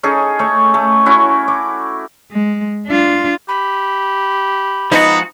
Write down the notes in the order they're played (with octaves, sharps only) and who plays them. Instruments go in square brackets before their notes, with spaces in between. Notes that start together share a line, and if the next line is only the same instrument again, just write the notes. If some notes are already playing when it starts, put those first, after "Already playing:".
[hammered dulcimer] C#4 D#4 G#4 A4
A3 C#5
A3
C#4 E4 F#4
D6
[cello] G#3
D4 F4
[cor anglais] G4 [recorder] B5
[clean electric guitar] F3 G#3 F#4 [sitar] B3 D#4